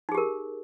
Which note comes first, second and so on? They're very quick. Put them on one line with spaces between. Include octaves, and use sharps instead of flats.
D#4 G#4 G4 A#4